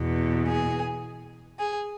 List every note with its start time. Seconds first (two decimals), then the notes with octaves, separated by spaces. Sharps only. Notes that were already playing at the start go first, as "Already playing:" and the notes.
Already playing: E2 B2
0.47 G#4
1.59 G#4